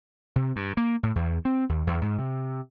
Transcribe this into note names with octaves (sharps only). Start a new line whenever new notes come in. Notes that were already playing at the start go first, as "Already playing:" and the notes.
C3
G2
A#3
A2
E2
C4
D#2
E2
G#2
C3